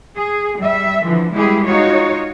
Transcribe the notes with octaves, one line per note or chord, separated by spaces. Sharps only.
G#4
G3 E5
D3 E3 F3
G3 G#3 B3 E4 G4 G#4
D#4 F4 F#4 C#5